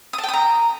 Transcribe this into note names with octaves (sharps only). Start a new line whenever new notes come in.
D#6
A5
G5
D#6
A#5